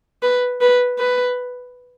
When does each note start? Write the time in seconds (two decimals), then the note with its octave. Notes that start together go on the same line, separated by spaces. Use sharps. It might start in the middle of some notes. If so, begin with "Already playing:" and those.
0.23 B4
0.61 B4
0.99 B4